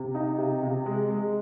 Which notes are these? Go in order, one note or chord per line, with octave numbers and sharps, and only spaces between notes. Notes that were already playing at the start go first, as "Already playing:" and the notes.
Already playing: C3
D#4
C3
C3
G#3
G#3